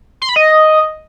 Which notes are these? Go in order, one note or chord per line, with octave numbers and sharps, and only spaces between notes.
C6
B5
D#5